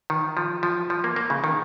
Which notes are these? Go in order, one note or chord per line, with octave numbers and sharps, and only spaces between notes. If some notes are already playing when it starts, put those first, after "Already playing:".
D#3
F3
F3
F3
A#3
A#3
C#3
D#3